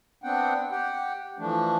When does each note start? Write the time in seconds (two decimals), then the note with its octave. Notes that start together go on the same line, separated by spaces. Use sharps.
0.24 B3 C4 D4 F#5 G5
0.71 G4 F#5 G5
1.38 E3 F3 A3 D4